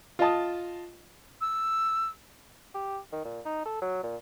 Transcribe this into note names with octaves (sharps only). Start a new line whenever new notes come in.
F4 D#5 A5 D#6
E6
G4
D#3
A#2
D#4
A4
F#3
A#2